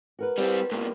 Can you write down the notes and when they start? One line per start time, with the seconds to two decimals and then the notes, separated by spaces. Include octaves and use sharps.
0.19 F#4 A#4 B4
0.38 G3 C4
0.71 G2 B2 A#3 G4